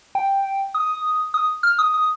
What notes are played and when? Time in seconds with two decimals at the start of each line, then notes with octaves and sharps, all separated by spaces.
0.15 G5
0.74 D#6
1.34 D#6
1.63 F6
1.79 D#6
1.94 D#6